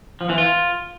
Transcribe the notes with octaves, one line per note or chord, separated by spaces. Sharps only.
F3
E3
F4